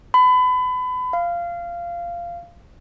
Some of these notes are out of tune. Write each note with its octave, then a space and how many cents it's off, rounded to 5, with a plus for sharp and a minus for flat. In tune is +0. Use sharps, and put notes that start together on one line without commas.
B5 +30
F5 -15